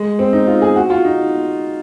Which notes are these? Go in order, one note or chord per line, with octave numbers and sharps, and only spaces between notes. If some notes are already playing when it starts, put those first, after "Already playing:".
Already playing: G#3
C4
D#4
F4
G#4
F#4
F4
D#4